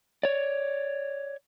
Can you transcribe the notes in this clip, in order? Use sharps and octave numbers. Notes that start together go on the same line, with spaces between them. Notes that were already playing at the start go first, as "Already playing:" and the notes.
C#5 D5